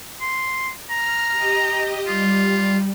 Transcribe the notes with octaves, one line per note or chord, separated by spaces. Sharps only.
C6
A#5 F6
G4 D#5
G3 F4